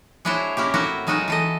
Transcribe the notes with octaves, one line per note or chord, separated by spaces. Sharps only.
G#3 D4 E4 F#4 C5 C#5
A#3 C#4 E4 G4
A2 C4 E4 F#4 A#4 F#5
F#3 G#3 D#4 F4 F#4
E3 A4 D#5